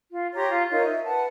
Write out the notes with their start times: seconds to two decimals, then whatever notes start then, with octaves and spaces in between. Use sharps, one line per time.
0.12 F4
0.34 G4 C#5 A#5 C6
0.50 F4
0.70 D#4 F4 A#4 C#5
0.86 E5
1.04 B4 F#5 A5